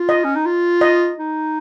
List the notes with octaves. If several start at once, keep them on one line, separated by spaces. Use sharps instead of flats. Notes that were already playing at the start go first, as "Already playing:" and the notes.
Already playing: F4
D#5
C#4
D#4
F4
D#5
D#4